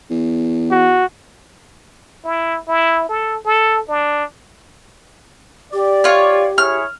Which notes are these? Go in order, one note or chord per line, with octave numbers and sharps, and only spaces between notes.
E2
F#4
E4
E4
A4
A4
D4
G4 D5
F4 C#5
E4 G#4 C#5 F6